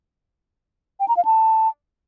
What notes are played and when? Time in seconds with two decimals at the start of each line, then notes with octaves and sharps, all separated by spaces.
1.00 G5
1.08 A#5
1.17 F5
1.25 A5